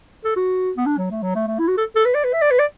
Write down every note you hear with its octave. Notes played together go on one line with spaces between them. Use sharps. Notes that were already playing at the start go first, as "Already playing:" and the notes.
A4
F#4
B3
D4
F#3
A3
F#3
A3
A3
E4
F#4
A4
A4
B4
D5
B4
E5
D5
B4
D5